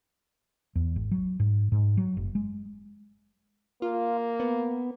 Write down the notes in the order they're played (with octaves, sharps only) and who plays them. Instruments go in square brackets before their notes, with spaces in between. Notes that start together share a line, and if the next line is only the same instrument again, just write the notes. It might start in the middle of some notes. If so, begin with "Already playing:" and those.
[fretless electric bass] E2
G#1
F#3
G#2
G#2
F#3
F#1
G#3
[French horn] A#3 [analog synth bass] F4
[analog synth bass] B3